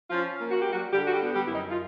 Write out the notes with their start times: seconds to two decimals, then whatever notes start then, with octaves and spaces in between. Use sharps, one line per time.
0.10 F3 C#4 F4
0.38 A#3
0.51 F#4
0.62 G3 G4
0.73 F#3 F#4
0.93 D3 G3 G4
1.07 F#4
1.14 G3 G4
1.20 B3
1.35 G3 G4
1.47 F#2 E4
1.55 D#4
1.71 F4